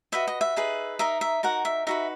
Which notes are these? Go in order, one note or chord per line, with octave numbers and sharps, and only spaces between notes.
F#4 B4 D#5 E5
D#5
E5
D#4 G#4 B4
D#4 A#4 D#5 E5
E5
D#4 F#4 A#4 F#5
E5
D#4 F#4 B4 E5